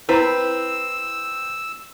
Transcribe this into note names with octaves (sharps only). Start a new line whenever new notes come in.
C4 E4 A#4 B4 A#5 E6